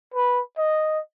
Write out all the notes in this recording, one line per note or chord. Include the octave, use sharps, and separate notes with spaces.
B4
D#5